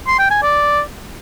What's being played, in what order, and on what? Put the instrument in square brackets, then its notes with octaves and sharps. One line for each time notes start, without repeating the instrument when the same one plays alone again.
[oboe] C6
G5
G#5
D5